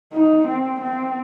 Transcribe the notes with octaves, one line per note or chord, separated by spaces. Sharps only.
D#4
C4
C4